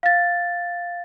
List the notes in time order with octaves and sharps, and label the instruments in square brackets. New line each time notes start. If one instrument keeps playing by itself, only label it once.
[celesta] F5 A6